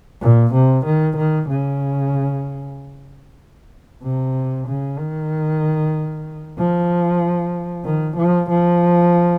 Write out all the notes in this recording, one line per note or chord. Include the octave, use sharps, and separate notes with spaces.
A#2
C3
D#3
D#3
C#3
C3
C#3
D#3
F3
D#3
F3
F3